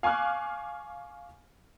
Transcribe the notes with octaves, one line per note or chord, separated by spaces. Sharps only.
F5 G#5 C#6 D6 F6 F#6